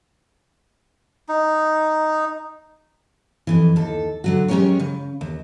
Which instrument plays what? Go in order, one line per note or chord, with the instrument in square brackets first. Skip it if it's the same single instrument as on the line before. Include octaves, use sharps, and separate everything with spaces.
[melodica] D#4
[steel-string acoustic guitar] F2 G#2 E3
D#2 A4
D3 F#3 F#4
F#3 G#3 C#4 G4 A#4 C#5
C#3
D#2